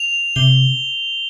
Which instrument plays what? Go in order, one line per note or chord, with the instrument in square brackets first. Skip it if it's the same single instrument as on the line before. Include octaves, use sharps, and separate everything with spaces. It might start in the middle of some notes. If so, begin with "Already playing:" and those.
Already playing: [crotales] F7
[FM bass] C3 [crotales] G7